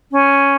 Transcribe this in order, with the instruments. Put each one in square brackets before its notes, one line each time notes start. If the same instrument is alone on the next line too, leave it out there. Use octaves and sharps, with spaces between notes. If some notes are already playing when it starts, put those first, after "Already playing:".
[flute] C#4